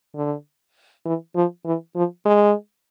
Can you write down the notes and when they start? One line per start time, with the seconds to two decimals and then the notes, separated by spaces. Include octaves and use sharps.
0.15 D3
1.06 E3
1.36 F3
1.65 E3
1.96 F3
2.26 G#3